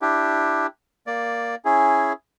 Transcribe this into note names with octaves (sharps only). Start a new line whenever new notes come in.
D4 E4 G4
A#3 D5
C#4 E4 G#4